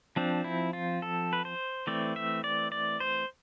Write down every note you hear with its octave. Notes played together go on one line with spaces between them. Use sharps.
F3 C4 D4
E4
F4
A4
B4
C5
E3 A3 C4 D5
E5
D5
D5
C5